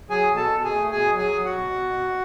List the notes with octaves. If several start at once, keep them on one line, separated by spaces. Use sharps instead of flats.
F#3 G#4 G#5
B2
A4 A5
B2
G#4 G#5
A3
B2 G#4 G#5
F#3
G#4 G#5
F#3
F#4 F#5
B2
B2
B2